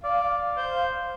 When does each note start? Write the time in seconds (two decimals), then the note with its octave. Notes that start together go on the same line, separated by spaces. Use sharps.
0.04 D5 F5
0.57 C5